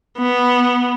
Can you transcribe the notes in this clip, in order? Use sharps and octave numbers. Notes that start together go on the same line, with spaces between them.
B3